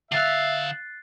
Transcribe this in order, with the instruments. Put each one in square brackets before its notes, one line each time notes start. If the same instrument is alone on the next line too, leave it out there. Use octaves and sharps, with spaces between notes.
[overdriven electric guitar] D3 F5 [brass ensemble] E5 [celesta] F#6 A6 C7